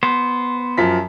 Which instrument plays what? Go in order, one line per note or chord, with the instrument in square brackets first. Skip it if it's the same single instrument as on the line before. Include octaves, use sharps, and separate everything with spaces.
[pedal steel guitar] B3 C5
[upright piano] F#2 F3 B6